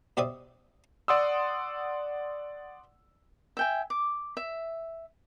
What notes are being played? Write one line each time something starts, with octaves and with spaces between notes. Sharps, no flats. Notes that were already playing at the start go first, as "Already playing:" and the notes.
B2 G4 C5 D5 E5 D#6
D5 F#5 C6 D#6 E6
E5 G5 G#5
D6
E5